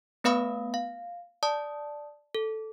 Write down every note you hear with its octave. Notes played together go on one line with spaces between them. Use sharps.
A3 B3 B4 F5 B5 D#6
F5
D5 A5 D#6
A4